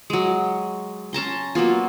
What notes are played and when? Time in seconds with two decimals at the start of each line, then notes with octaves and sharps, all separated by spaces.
0.10 F#3 G#3
1.13 C#4 A5 A#5 C6
1.55 F#3 A#3 B3 F4